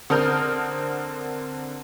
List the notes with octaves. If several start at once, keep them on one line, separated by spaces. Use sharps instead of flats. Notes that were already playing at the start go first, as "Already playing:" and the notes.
D3 C4 A#4 D#6 F6 G6